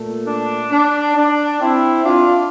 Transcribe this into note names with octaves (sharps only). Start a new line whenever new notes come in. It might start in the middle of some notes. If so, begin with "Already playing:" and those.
Already playing: A#2 A3
D4
D4
D4
C4 E4
D4 F4